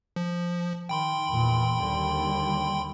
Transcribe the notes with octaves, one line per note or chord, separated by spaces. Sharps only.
F3
D#3 G5 B5 C6
E2 A#2 E3
D#2 D3 G3